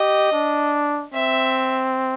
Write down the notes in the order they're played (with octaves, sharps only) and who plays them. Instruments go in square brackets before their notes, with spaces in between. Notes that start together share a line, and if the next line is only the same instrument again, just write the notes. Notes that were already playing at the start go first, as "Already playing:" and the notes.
Already playing: [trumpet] G4 [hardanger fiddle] D#5
[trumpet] D4
[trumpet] C4 [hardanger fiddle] E5